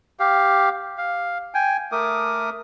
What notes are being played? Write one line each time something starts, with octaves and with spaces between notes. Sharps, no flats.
G4 F5
F5
G5 G#5
A3 A#4 D6 D#6